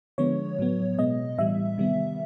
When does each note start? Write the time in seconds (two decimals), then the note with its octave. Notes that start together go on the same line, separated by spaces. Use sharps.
0.18 D3 F3 G#3 B3 C#5
0.59 A2 F#3 B3
0.98 B2 G#3 B3 D#5
1.38 A2 E3 G3 E5
1.78 C3 D#3 G3 B3